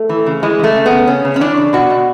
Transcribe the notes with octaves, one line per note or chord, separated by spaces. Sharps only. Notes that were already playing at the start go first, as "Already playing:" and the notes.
Already playing: A3
E3
C#3
E3 G#3
C#3 A3
C#3
B3
C#3
C#3 C#4
C#3
C#4
E3 D4
C#3
B2 F#4
B2